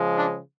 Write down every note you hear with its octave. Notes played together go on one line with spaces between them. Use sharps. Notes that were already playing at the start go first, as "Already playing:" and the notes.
Already playing: C#3 F3 G#3
D4